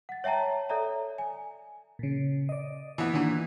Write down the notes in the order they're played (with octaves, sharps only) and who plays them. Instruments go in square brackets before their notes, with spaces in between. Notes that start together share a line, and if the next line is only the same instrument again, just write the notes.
[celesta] F#5 A6
C#5 E5 G5 A5 A#5
A4 C#5 D5 E5 A#5
G#5
[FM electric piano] A#2 C#3
D5 D#5
[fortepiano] E3 B3
[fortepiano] A#2 E3 [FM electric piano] D#3 D4